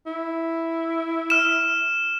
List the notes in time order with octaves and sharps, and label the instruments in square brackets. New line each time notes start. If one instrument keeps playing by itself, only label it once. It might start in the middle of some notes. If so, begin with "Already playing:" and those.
[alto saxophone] E4
[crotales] F6 E7